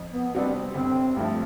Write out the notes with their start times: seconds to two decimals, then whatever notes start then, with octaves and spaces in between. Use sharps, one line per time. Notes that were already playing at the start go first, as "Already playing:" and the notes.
Already playing: F2
0.12 B3
0.33 C3 G3 B3 C4 D4
0.54 C4
0.75 G1 C4
1.16 G2 F3 A3